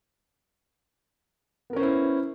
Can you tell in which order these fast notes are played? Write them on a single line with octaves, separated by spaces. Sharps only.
B3 A#4 C#4 C5 E4